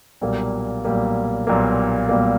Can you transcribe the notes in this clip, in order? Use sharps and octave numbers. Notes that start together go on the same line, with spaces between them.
B1 A#2 G3 A#3
B1 A#2 G3 A#3
B1 A#2 G3 A#3
B1 A#2 G3 A#3